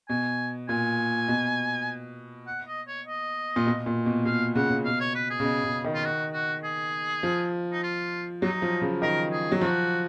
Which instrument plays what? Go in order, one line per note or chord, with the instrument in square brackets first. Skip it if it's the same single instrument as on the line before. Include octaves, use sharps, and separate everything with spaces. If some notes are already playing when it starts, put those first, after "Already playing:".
[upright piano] B2 [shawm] G#5
[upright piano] A#2 [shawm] G#5
[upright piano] B2
[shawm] F#5
D#5
C#5
D#5
[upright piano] A#2
B2
A#2
B2
[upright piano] B2 [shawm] F5
[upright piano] C#3 [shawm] F#5
[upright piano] C#3
[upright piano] B2 [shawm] F5
[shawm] C#5
B4
G#4
[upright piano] C#3
B2
C#3
D#3
[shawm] F4
F#4
F#4
G#4
[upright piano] F3
[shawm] D#4
F4
[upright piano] F#3 [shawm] D#4
[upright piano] F3
C#3
[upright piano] D#3 [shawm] A#4
[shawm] G#4
[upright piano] F#3
[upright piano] F3 [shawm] F#4